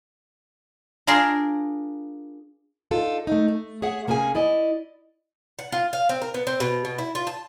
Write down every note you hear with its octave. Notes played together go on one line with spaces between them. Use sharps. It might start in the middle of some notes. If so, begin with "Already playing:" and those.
D4 F4 G#4 A#4 C6
D4 D#4 F4 A4
A3 D#4
A3
G#4 C#5 E5 F#5
C3 A#3 C#4 G#4 G#5
E4 D5 D#5
F#5
F4
F5
C4
A#4
B3
C4
B2
B2
E4
F4
A5